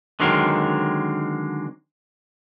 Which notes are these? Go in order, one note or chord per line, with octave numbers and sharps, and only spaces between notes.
D3 D#3 F#3 G#3 C4 A#4